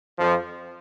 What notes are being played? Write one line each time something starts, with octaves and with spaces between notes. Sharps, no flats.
F2 F3